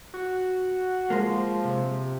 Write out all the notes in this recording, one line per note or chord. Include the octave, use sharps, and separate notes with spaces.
F#4
F3 G#3 A#3
C3